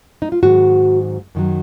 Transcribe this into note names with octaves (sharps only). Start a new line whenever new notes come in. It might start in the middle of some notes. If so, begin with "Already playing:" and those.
D#4
F4
G#2 D#3 F#3 F#4
F#2 D#3 F#3